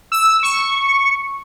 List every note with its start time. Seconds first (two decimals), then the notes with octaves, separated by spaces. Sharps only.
0.12 E6
0.43 C#6